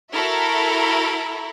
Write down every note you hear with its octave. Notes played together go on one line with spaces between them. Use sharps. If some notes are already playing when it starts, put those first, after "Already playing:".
E4 F#4 A4 A#4 E5